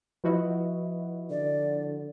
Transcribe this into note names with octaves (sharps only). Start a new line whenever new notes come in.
F3 E4 F#4 B4 D#5 E5
D3 D5